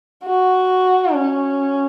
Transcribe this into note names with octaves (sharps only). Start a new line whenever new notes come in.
F#4
C#4